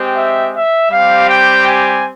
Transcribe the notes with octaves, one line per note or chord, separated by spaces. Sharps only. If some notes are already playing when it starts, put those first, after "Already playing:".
Already playing: G#3 C4 G4
E5
E5
G3 C4 G4 F5
G5
G#5